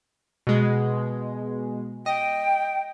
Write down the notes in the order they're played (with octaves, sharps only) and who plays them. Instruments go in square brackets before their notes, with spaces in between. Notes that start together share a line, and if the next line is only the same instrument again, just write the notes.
[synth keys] B2 G#3
[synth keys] D#5 [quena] G5